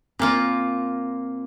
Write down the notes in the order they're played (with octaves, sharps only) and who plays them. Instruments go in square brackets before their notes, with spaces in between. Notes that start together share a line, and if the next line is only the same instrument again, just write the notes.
[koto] A#2 A#3 F4 [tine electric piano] C4